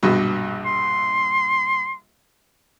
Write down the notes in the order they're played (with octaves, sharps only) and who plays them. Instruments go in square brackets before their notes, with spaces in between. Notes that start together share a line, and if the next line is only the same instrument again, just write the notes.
[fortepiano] A#1 G2 B2
[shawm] C6